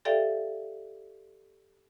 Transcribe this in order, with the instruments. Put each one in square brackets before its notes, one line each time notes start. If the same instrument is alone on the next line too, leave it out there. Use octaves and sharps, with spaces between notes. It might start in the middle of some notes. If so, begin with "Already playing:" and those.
[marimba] G4 A4 D5 E5 F5 G5